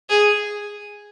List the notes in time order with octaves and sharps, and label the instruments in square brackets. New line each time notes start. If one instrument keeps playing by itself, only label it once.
[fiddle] G#4